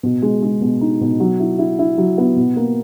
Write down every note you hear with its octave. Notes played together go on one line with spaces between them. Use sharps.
B2
G#3
G#3
B2
D#4
B2
F#3
E4
E4
E4
F#3
B3
B2
A#3